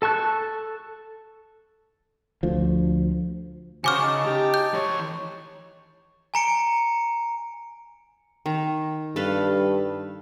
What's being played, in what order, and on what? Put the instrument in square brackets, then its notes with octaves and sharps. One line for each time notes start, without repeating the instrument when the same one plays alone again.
[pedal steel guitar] A4 A5 C#6 F#6
[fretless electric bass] D2 F3
[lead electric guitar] C#3 [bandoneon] F#4 C5 [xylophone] G#5 D6 F6
[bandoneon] D#4 A5
[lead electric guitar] G4
[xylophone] G6
[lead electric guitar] E3 C#5
[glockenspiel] G#5 A#5 C#7 D7
[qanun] D#3
[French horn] G2 [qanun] A4 B4 F5